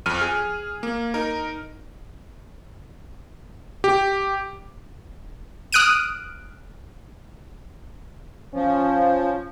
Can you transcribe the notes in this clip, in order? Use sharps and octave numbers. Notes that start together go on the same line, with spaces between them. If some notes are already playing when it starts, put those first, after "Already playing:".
F2 F6 D#7
G#4
A#3
D#4 A#4
G4
D#6 F6 F#6 D7 D#7
F3 C#4